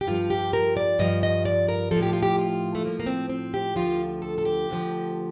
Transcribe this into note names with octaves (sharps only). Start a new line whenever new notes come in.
G4
G2 F3 F4
G4
A#4
D5
G2 F3 D#5
D#5
D5
A#4
A2 F3 A4
G4
F4
G4
F4
A3
A2 F3 A#3
A#3
C4
C4
G4
D2 D3 F3 F4
A4
A4
G4
D2 D3 F3